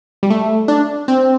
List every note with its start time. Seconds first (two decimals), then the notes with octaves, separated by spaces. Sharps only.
0.23 G3
0.30 A3
0.68 D4
1.08 C4